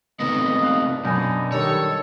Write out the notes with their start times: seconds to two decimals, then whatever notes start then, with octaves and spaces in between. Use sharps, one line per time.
0.20 C3 A3 B3 D#4 D#5
0.63 D4 F5 F#6
1.05 F#2 B2 D#4 G#5 B5
1.52 D#3 G3 A4 C#5